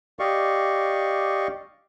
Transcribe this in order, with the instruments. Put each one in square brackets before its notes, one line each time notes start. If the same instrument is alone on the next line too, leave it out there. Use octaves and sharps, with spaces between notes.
[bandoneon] G4 D5 D#5 F5 C#6